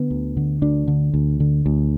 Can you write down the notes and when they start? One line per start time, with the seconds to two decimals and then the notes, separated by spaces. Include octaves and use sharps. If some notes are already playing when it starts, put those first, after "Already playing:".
Already playing: D3 B3
0.11 D2
0.37 D3
0.62 D2 D4
0.88 D3
1.14 D2
1.40 D3
1.66 D2